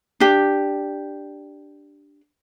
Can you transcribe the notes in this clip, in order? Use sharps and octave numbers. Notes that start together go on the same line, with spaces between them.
D4 G4